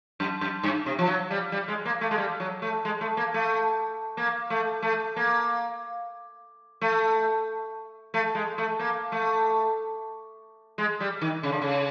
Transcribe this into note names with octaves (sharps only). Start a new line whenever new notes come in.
F#2
F#2
G2
C3
F3
F#3
G3
G3
G#3
A#3
A3
G#3
G3
F#3
A3
G#3
A3
A#3
A3
A#3
A3
A3
A#3
A3
A3
G#3
A3
A#3
A3
G#3
G3
D#3
C#3
D3
C#3